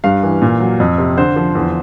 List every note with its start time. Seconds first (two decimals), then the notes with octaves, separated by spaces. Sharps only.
0.04 G2 F5
0.23 E3
0.41 A#2
0.60 F#3
0.80 F2
0.98 C3
1.17 D3 C5
1.36 F3
1.55 E2